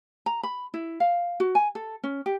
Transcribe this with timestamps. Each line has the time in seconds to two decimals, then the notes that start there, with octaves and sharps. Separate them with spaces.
0.26 A#5
0.43 B5
0.74 E4
1.00 F5
1.40 F#4
1.55 G#5
1.75 A4
2.04 C#4
2.26 G4